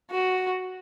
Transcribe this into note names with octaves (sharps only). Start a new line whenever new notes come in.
F#4